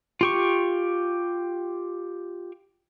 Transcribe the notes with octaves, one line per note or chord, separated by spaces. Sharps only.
F4 G4 C#6